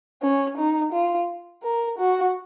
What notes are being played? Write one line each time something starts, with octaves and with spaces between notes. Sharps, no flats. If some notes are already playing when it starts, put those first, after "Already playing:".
C#4
D#4
F4
A#4
F#4